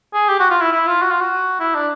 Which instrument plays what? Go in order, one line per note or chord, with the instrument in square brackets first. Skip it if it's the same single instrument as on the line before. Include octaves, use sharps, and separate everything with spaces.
[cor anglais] G#4
G4
F#4
F4
E4
E4
F4
F#4
F4
F#4
E4
D4